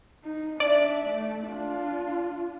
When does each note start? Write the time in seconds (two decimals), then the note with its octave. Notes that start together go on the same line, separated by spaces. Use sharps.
0.24 D#4
0.60 D4 D5 E5
1.07 A3
1.47 D4 F4